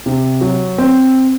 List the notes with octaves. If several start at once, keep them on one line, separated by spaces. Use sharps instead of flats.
C3
F#3
C4